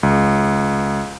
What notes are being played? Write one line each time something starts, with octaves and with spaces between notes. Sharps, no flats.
C#2